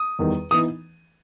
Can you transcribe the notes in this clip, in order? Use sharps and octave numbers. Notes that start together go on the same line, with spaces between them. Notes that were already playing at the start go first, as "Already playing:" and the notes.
Already playing: D#6
E2 D#3 G3
E3 B3 D#4 D#6